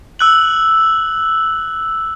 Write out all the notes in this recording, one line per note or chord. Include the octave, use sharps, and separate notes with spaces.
E6 F#6 F#7